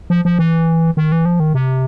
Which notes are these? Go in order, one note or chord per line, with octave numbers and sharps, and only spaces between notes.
F3
F3
E3
D#3
E3
F3
D#3
C3